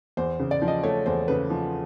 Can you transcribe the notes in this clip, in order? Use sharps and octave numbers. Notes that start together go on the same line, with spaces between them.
E2 C5
C#3
D5
F3
D#5
A3 C#5
E2 C5
C#3 B4
F3